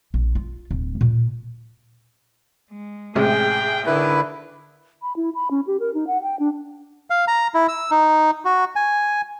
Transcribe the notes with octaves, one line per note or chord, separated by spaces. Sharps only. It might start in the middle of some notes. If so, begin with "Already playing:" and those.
A#1
F4
D1
A#2
G#3
A1 C3 G#3 G#4 G5
D3 D#3 E4 B4
B5
E4
B5
C#4
G4
A#4
D#4
F#5
G5
D4
F5
A#5
E4
E6
D#4
F#4
G#5